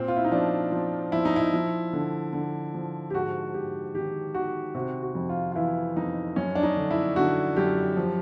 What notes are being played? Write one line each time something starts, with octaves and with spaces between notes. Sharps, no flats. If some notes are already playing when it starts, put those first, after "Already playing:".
Already playing: A#2 C4
F4
E4
D#4
F3 D4
F3
F3 E4
D#4
E4
F3
D3
D3
F3
G4
G#2 F#4
G#2 G4
D#3 G4
D#3 F#4
C3 F#4
F#4
F2
F4
F4
E3 E4
F2 D#4
F#2 C#4
D4
D#4
D3
E4
D3 F#4
F#2 G4
F3